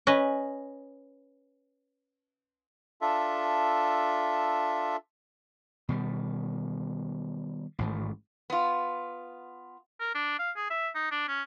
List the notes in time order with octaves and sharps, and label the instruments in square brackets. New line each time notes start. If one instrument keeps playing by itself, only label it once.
[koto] C#4 B4 D#5
[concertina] D4 F4 A4 E5
[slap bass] B2 D#3 G3
A1 G#2 D#3 A3
[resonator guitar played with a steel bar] B3 F4
[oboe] A#4
D4
F5
G#4
E5
D#4
D4
C#4